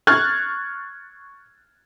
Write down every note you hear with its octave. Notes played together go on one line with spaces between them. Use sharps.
C#6 F6 F#6 G#6 A6